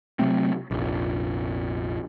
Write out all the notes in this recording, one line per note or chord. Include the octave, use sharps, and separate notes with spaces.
C3 F#3 A3 C4
F1 A#1